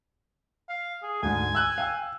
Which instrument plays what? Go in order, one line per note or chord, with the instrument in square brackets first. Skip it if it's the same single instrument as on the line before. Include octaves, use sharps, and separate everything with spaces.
[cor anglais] F5
G#4
[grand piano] D2 G#2 [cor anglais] G#5
[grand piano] E6 F#6
F5 G5 E6